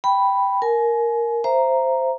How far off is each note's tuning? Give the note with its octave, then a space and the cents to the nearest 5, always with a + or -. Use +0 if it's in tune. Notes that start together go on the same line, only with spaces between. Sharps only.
G5 +0 B5 +0
A#4 +0 G#5 +30
C5 +0 E5 +30 A#5 +0